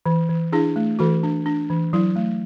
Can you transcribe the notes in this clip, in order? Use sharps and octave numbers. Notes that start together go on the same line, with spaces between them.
E3
E3
D4 E4 G#4
A3
E3 F#4 A4
D4
D4
E3
F#3 E4
A3